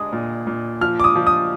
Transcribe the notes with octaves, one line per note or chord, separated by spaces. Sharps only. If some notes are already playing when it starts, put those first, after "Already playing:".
Already playing: G#3 D4 D#6
A#2
A#2
F3 F6
D6
D#6
F3
D#6